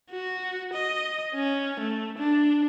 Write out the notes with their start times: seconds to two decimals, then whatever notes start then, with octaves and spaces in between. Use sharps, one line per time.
0.10 F#4
0.73 D#5
1.35 C#4
1.79 A3
2.18 D4